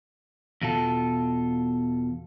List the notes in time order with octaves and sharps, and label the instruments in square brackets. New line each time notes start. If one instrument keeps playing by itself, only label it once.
[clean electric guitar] E2 B2 F4 A4